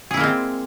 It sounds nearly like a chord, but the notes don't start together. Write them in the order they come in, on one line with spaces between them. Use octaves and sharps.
G#4 E4 A#3 G#3 C4